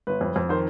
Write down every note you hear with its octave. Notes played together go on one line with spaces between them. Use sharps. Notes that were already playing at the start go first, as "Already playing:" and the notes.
G1 B4
F2
F2
D#3 C5